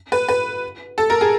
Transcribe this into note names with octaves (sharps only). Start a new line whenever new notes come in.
B4
B4
A4
A#4
G#4